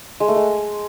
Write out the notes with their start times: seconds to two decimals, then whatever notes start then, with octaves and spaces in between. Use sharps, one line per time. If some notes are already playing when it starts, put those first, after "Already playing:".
0.20 G#3
0.28 A3
0.36 G#3